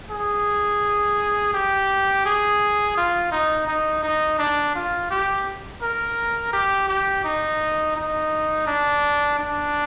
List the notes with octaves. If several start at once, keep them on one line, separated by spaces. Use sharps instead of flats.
G#4
G4
G#4
F4
D#4
D#4
D#4
D4
F4
G4
A#4
G4
G4
D#4
D#4
D4
D4